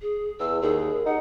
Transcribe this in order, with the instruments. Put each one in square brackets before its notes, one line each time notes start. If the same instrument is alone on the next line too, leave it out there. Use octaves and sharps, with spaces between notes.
[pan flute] G#4
[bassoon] E2 [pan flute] E6
[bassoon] D#2 [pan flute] G#4
[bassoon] D#4 [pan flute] F#5